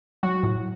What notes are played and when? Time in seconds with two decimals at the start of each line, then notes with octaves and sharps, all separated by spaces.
0.23 F#3 F#4
0.43 A2